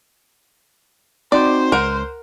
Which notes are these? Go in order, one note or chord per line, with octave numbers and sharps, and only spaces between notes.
C4 D#4 F#4 C5 D5
C#2 A#4 F#5